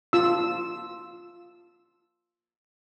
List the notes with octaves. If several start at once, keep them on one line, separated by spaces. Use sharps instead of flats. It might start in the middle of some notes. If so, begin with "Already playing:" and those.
F4 E6